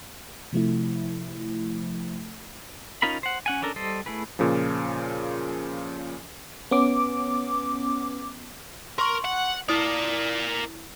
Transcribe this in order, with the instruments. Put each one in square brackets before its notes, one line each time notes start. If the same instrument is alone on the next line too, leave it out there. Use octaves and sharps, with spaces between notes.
[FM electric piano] C3 F3 A3 E4
[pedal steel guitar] C#4 D#4 F4 A#4 B5
C5 F#5
C#4 F#5 G#5
C#4 D4 A4 A#4
G3 A4 C5 D#5
A3 E4 G#4 B4
[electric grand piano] A#2 C#3 F3
[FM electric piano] B3 C#4 D6
[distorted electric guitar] A#4 [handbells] C6 C#6
[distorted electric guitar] F#5
[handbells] E4 D#6 [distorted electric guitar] A#4 D5